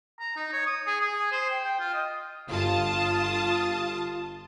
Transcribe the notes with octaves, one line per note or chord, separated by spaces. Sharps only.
A#5
D#4
C#5
D#6
G#4
G#4
C5
G5
G5
F4
D#5
G1 F4 A5 D#6